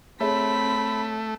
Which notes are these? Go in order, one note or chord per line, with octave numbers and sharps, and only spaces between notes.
A3 C4 G#4 C#5 E5 B5 B6